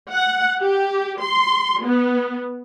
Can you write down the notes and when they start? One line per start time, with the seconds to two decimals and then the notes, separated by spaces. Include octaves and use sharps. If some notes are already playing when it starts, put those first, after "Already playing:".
0.12 F#5
0.62 G4
1.22 C6
1.83 B3